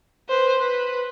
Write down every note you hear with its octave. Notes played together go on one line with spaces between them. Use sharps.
B4 C5
B4